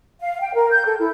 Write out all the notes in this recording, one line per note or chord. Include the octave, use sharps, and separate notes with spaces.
F5
G5
A#4
G6
A4
E4